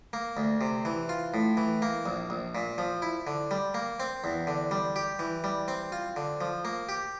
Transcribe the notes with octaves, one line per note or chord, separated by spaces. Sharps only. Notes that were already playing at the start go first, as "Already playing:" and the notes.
A#3
D2
C3
E3
F4
A2
E3
A#3
A#1
A#1
A#2
F3
E4
D3
G3
A#3
C4
E2
D3
G3
G4
E3
G3
C4
F4
D3
F3
A#3
G4